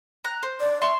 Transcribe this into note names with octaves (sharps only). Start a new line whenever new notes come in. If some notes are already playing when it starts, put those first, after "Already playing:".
A#5 F#6
C5
D5
E5 A5 C6 C#6